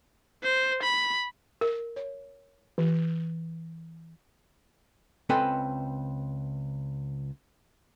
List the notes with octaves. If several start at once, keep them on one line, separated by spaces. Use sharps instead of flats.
C5
B5
A#4
C#5
E3
C#2 C4 A4 B4 D#5 G#5